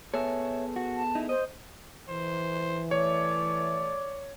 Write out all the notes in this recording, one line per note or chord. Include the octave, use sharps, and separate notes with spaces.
B3 G#4 A4 C#5 E5
F#4
A5
D#4 E4
C5 D#5
E3 C5
A3 C#5 D5